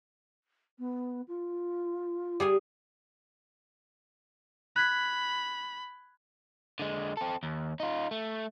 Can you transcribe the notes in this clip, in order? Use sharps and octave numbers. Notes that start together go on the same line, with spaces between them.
B3
F4
G3 G#4 G#5
B5 F#6 G#6 B6
D3 G#3
C4 A4
D#2
D#4 F4
A3